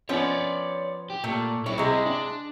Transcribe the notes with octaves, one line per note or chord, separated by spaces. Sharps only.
F3 B3 C#4 C#5 D5
G4
A#2 A3
C4 E4 C#5
C3 G#3
D4